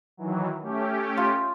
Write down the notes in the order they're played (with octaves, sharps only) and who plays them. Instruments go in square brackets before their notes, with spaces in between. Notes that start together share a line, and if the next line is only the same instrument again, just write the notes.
[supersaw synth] D#3 E3 F#3
A3 C#4 G4
[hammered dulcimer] F4